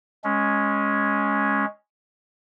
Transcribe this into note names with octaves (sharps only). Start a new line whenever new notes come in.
G#3 C#4